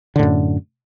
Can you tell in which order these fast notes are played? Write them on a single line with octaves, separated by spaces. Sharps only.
D3 A2 F#2